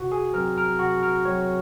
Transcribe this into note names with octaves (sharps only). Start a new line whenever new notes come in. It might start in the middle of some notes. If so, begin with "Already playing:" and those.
Already playing: C3 F#4
G#4
F#3 C4 A#4
A#4
C3 F#4
A#4
F#3 C4 C#5